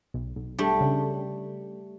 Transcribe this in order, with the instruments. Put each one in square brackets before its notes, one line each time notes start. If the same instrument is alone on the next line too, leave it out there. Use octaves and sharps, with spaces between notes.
[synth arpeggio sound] B1
B1
[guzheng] G3 A3 [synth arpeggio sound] D4
[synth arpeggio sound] C#3